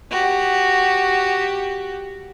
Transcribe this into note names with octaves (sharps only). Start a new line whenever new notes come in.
F#4 G4